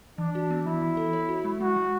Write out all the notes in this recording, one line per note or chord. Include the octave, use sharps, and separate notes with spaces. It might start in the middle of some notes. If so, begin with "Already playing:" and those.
E3 D4
F#4
B3
E3 E4
E3
A4
C#5
F#4
G#3
G#3 F#4
G#3